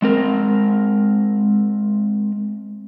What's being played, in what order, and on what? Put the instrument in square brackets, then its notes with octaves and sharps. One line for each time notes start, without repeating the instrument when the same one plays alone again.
[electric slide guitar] G#3 C4 A#4